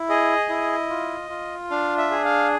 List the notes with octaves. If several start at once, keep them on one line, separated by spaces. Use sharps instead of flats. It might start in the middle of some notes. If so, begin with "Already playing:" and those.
Already playing: E4
G#4 D#5
E4
F4
F4
D4 F5
E5
G#4
F5